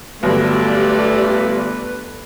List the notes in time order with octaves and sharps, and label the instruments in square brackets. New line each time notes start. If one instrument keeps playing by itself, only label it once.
[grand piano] G1 F#3 [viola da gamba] A3 [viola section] D4 G4 D5 [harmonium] B4